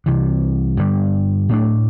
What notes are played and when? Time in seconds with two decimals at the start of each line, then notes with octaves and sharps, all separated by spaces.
0.06 C2 C3 E3
0.77 G2 D3 G3
1.49 A2 A3 D4